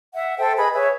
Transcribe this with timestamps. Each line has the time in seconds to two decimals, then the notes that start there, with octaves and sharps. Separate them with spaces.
0.14 E5 F#5
0.38 A4 C5 E5 G5
0.57 G#4 B4 D#5 B5
0.72 G#4 B4 C#5 E5